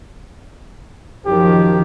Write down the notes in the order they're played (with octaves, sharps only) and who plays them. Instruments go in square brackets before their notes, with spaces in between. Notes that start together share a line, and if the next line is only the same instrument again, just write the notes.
[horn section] F#2 G4 [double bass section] D#3 F3